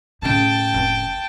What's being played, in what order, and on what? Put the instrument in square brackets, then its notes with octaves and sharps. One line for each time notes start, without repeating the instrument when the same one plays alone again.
[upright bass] A2 C#3 [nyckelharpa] G5 A5
[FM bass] F1